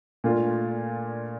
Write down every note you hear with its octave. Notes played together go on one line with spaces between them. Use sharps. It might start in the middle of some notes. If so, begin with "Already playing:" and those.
A#2 A3 D4 F4